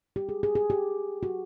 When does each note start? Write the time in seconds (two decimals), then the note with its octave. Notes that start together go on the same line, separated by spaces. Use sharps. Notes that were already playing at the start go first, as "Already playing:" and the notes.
0.16 G4
0.29 G#4
0.43 G#4
0.55 G#4
0.70 G4
1.23 F#4